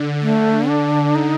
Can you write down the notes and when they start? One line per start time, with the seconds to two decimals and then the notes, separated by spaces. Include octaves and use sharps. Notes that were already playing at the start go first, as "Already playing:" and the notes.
Already playing: D3
0.22 A3
0.68 D4
1.15 D#4